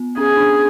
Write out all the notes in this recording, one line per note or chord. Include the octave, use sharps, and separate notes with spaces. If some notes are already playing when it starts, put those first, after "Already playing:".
Already playing: B3
C#4 G#4
D4